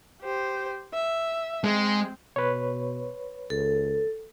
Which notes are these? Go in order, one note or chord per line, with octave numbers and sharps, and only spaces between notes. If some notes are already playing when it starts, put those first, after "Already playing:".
G4 C5
E5
G#3 C4
B2 B4 C#5
C#2 A4